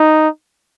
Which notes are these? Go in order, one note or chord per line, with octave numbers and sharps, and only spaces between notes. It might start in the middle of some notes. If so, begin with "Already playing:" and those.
Already playing: D#4